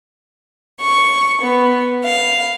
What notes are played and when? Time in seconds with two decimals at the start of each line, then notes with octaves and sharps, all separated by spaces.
0.81 C#6
1.41 B3
2.04 F5